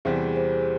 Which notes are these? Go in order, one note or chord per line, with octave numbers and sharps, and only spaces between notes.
E2 C3 E3 G3 C4 G#4 C5
G#4 C5